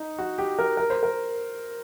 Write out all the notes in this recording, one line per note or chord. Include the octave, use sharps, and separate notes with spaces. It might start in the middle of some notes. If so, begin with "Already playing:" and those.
Already playing: D#4
F#4
G4
A#4
A#4
C5
A#4